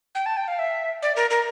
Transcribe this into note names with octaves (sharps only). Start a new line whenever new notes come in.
G5
A5
G5
F5
E5
D5
A#4
A#4